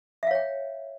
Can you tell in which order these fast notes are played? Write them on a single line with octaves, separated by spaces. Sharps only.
E5 F5 C#5 G5